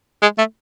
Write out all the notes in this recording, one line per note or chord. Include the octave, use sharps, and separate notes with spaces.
G#3
A3